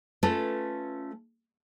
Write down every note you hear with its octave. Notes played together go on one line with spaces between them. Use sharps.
A3 C#4 F4 A4 B4